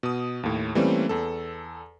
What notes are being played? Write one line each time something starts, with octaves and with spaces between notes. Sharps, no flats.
B2 D#6
D#2 A2
E3 G3 A3 A#3 C4 C#4
E2 A4